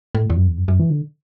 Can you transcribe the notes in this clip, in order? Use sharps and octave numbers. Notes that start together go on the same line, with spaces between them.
A2
E2
F#2
E2
F#2
F#2
E3
D3